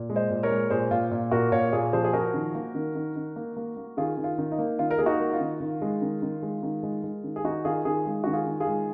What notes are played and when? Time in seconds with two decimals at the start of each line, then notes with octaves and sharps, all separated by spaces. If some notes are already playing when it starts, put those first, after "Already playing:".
Already playing: A#2
0.10 G#3
0.16 C5 D#5
0.30 A#2
0.43 A#4 C#5
0.50 G#3
0.70 A#2 G#4 C5
0.91 A#2 F4
1.11 A#2
1.31 A#2 F#4 A#4
1.52 A#2 C#5 F5
1.63 A#4
1.73 A#2 F4 G#4
1.93 F3 G#4 C5
2.04 G#4
2.13 F3 F#4 A#4
2.34 D#3
2.55 A#3
2.75 D#3
2.95 D#3
3.16 D#3
3.36 A#3
3.57 A#3
3.77 A#3
3.97 D#3 F4 G#4
4.17 D#3
4.24 F4
4.38 D#3
4.52 D#4
4.58 A#3
4.79 D#3 F4
4.91 A#4
4.98 A#3 G#4
5.06 D#4 F#4
5.20 A#3
5.33 F4
5.40 D#3
5.60 D#3
5.82 G#3
6.02 D#3
6.22 D#3
6.42 G#3
6.63 D#3
6.83 G#3
7.04 G#3
7.24 D#3
7.36 G#4
7.44 D#3 D#4 F#4
7.65 D#3 F4 G#4
7.85 D#3 F4 G#4
8.06 G#3
8.24 D#3 F#4
8.33 F4 G#4
8.47 D#3
8.60 F4 G#4
8.67 G#3